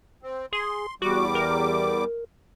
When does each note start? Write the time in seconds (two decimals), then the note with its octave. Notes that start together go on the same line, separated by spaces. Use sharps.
0.23 C4
0.53 G#4 C6
1.02 E2 G3 F#4 D6
1.35 A#4